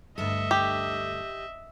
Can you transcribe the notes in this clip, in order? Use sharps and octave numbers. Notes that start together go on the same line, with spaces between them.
D2 G2 A4 D#5 E5
G4